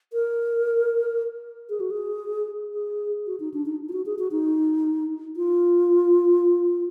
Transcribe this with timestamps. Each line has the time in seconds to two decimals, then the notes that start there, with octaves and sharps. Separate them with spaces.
0.13 A#4
1.70 G#4
1.80 F#4
1.91 G#4
2.75 G#4
3.27 F#4
3.40 D#4
3.54 D4
3.66 D#4
3.89 F4
3.93 F#4
4.06 G#4
4.19 F#4
4.31 D#4
5.37 F4